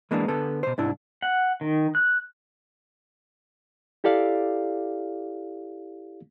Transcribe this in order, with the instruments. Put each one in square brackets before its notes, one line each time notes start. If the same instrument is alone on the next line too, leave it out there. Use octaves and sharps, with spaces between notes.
[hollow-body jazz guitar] E3 G#3 A#3 B3 D4
D3 B3 A4
B2 C5
C2 G#2 D4 E4
[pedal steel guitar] F#5
D#3
F#6
[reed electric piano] E4 G4 A4 D5 F5